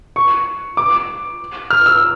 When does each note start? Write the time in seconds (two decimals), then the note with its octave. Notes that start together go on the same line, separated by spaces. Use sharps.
0.16 C#6
0.77 D6
1.70 F6
1.86 E6